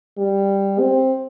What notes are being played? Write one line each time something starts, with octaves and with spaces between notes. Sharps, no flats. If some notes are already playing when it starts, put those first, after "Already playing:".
G3
C4